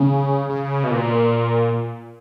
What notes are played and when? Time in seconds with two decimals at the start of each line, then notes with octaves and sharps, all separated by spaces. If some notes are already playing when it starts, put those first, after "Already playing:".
Already playing: C#3
0.49 C#3
0.84 B2
0.91 A#2